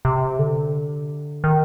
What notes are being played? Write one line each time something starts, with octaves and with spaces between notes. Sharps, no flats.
C3
D3
D#3